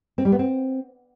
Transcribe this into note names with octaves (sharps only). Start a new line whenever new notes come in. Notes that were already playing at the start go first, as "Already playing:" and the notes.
C4
G3
B3
C4